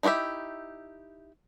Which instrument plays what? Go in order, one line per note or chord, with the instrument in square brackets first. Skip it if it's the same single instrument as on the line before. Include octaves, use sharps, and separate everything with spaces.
[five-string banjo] D#4 E4 F#4 G4 E5